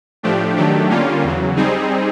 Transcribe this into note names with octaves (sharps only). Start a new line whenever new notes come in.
A2 F3 A3 D4 G4
D#3 F#3 A3 D4 G4
D3 G3 A#3 C#4 F4
E2 C#3 F#3
G3 C4 D#4 G#4